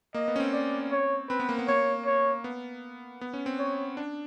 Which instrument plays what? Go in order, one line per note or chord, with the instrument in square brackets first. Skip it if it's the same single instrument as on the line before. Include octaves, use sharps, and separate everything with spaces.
[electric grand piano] A#3 [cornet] D#5
[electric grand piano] B3
C#4
C4
[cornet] D5
C#5
[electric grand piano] C4 [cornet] B4
[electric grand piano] B3
A#3
B3
[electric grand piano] A#3 [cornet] C#5
[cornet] C#5
[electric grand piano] B3
B3
C#4
C4
[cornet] C#5
[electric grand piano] D4